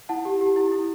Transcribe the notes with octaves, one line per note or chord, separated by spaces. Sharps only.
E4 F#5 A5
G4
G4
E4
E4